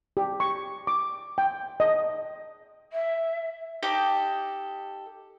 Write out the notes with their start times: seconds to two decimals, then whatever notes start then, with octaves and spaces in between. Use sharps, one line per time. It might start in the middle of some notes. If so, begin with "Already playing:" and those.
0.17 G4
0.40 C#6
0.87 D6
1.38 G5
1.80 D#5
2.92 E5
3.83 D#4 G4 A4 D6